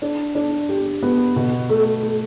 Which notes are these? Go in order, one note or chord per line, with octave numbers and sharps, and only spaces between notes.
D4
D4
G4
B3
B2
A3
A3